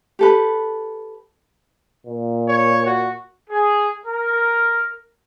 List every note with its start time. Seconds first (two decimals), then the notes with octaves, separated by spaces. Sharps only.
0.19 G4 A4 B4
2.06 A#2
2.48 C#5
2.86 F#4
3.50 G#4
4.06 A#4